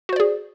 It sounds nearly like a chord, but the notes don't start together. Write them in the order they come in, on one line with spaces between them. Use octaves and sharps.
F#4 C5 D5 G#4